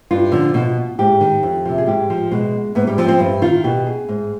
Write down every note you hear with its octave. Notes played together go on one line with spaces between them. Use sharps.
G2 F4
D3 F3
B2
G#2 G4
D#3
F2
C3 F3
G#4
G#2 G4
F3
B2 G#3
G#2 B3
G3
F3 C4
C4
G2
D#3 F4
B2 G4
G#4
G#2